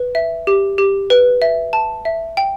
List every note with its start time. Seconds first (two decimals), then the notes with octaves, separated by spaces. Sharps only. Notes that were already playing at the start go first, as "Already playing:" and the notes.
Already playing: B4
0.15 E5
0.47 G4
0.78 G4
1.10 B4
1.42 E5
1.73 A5
2.05 E5
2.37 G5